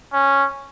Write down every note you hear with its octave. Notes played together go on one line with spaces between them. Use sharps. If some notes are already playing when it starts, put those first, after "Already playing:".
C#4